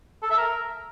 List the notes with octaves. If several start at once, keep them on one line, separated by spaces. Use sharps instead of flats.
A4
E5
A#4